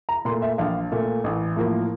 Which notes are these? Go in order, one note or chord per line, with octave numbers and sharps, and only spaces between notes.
A#5
A#2 A3 C6
E5
A#1 F5
A#2 A3
A1
A2 F3 A#3